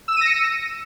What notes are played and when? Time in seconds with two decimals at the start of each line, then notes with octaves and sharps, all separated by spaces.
0.08 E6
0.12 E7
0.17 D#7
0.21 A#6
0.26 C#7